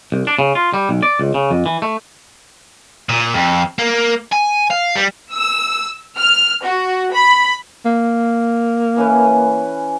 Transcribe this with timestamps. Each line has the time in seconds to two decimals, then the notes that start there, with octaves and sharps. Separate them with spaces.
0.12 C2
0.27 D4
0.39 C#3
0.55 F4
0.74 G3
0.89 B1
1.03 D5
1.19 C#2
1.34 C#3
1.51 F2
1.66 E3
1.82 A3
3.09 A#2
3.34 F2
3.79 A#3
4.33 G#5
4.71 F5
4.96 G3
5.32 E6
6.17 F6
6.66 F#4
7.12 B5
7.85 A#3
8.96 E3 C#4 B4